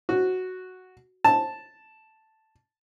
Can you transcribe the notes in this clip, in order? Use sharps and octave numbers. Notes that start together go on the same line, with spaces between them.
F#4
A5